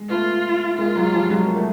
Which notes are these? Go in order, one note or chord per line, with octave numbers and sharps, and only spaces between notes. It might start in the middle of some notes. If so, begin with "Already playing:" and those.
Already playing: G#3
A3 B3 F4
G#3 A#3 F4
F#3 G#3
F3 G3
F#3 G#3
A#3
A3